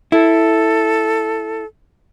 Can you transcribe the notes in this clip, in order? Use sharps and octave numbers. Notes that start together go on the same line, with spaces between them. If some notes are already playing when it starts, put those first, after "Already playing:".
E4 A4